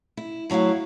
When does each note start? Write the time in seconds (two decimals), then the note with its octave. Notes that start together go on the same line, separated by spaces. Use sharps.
0.17 E4
0.50 A2 F#3 E4 F#4 F5